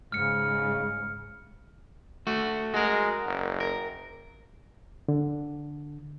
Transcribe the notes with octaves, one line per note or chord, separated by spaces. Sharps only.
G#2 C#3 F6 C#7
A3 F#4
G#3 F#4 A#4
F#1
A#4
D3